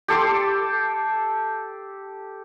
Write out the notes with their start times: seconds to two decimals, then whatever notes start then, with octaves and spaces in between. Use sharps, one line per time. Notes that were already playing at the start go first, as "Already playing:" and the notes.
0.08 G4 A4 C6 D6